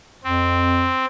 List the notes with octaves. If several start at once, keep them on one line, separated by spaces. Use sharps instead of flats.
F2 C4